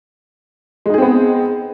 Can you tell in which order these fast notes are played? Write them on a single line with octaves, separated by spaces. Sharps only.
G#3 D#4 G#4 C4 B3